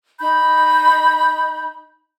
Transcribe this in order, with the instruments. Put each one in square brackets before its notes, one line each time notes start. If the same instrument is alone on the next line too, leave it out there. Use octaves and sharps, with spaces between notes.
[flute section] D#4 B5 G6